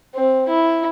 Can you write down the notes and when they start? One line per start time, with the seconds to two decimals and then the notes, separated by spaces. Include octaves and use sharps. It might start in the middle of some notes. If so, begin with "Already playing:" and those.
0.14 C4
0.49 E4